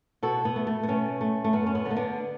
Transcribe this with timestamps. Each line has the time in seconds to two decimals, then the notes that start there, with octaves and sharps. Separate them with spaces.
0.23 B2 F#4 A4
0.45 B3
0.56 A3
0.67 A3
0.83 B3
0.88 B2 A3 C#4
1.21 A3
1.44 A3
1.53 F#2 B3
1.66 C#4
1.75 B3
1.85 D3
1.90 A3
1.96 B3 D4